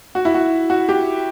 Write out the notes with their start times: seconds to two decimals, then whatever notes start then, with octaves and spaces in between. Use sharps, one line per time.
0.15 F#4
0.25 E4
0.34 F#4
0.70 F#4
0.89 G4